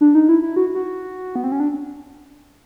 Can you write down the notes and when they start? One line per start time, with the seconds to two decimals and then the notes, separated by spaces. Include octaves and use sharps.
0.01 D4
0.15 D#4
0.29 E4
0.42 E4
0.56 F#4
0.75 F#4
1.35 B3
1.44 C4
1.52 C#4
1.60 D4